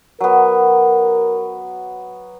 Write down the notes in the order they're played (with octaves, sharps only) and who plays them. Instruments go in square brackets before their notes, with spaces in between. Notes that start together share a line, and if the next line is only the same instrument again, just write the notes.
[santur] F#3 B3 [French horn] A#4